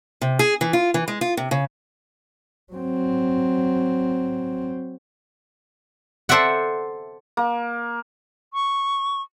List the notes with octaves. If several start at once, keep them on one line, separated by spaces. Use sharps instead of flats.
C3
G#4
E3
F4
E3
G#3
F4
C3
C#3
F#3 C4
A4 C5 D5 E5 F#5
A#3
C#6